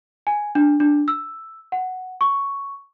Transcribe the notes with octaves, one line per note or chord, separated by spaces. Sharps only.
G#5
D4
D4
E6
F#5
C#6